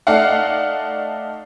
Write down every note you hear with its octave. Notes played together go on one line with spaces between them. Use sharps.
A3 D#4 A4 D5 F5 F#5